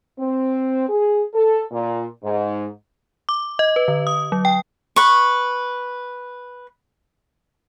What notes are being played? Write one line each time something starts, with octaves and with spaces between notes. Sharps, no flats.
C4
G#4
A4
A#2
G#2
D6
D#5
B4
D3
D#6
F#3
G5
B4 C#6